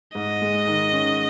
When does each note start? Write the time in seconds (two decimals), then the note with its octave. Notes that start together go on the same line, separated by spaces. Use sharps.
0.15 G#2 D#5
0.42 G#3
0.67 D#3
0.93 C#4